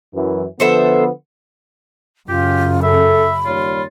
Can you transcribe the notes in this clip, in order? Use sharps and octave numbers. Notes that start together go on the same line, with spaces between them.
F#2 E3
D3 F3 B3 A4 C5 E5
F#2 C#3 F4 G4
A4 E5 B5
D#2 G3 F4 C#5